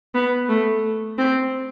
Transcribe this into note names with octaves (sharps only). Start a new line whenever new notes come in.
B3
A3
C4